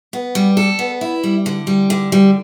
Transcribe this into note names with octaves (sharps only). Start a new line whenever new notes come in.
B3
G3
A4
B3
E4
G3
D3
G3
D3
G3